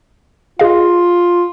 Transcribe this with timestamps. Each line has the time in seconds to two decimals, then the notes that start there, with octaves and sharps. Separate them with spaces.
0.59 F4 G#4 D#5 F5